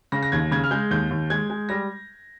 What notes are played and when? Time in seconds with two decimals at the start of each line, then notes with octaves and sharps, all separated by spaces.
0.12 C#3 A#6
0.23 A#6
0.32 D#2 G#6
0.52 C#3 G#6
0.64 F6
0.71 G#3 G6
0.91 D#2 G6
1.11 D#2
1.30 G#3 G#6
1.50 G#3
1.69 G3 A#6